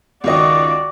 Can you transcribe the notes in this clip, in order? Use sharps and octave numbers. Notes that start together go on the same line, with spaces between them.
C#2 D#3 F#4 D5 D#5